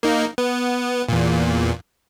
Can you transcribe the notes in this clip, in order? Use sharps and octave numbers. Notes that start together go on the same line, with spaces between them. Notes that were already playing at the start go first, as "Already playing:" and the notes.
A#3 D#4
B3
E2 A#2